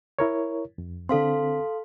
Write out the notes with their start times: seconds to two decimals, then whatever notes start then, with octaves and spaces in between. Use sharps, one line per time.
0.19 E4 A#4 C#5
0.78 F2
1.09 D3 C4 A4 F5 C6